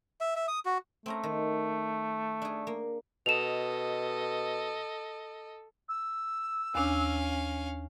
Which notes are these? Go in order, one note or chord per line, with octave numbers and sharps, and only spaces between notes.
E5
E5
D#6
F#4
A3 C4 C#4 A#5
D#3
D4 G#4
A#3
B2 A4 D#5 E7 F7
E6
D#2 C#4 D4 F5